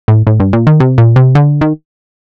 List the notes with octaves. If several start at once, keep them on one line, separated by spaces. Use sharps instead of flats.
A2
A2
G2
A#2
D#3
C3
A#2
C3
D3
D#3